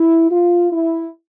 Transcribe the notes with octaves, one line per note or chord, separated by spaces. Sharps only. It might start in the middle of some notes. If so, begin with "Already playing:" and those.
Already playing: E4
F4
E4